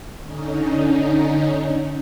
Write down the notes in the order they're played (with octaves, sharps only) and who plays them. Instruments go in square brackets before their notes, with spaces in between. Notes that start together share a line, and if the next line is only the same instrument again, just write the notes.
[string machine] D3 C#4 D#4